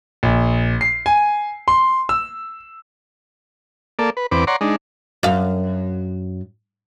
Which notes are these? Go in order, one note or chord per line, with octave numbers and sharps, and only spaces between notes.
A#1
C7
G#5
C6
E6
A#3 A4 D5
B4
E2 C4 B4 D6
C#5 D5 F#5 A#5 C6
G#3 D4 D#4
F#2 F5